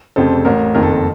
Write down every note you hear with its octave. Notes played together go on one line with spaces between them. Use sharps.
F1 F2 C#3 A4 C5
A1 A2 A#4
F#1 F2 D#3 A#4
A4
A#4